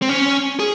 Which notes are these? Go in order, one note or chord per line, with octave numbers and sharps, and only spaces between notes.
C4
C#4
G#4